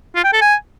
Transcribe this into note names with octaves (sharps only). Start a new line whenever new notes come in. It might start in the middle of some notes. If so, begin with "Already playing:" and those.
F4
G5
A4
G#5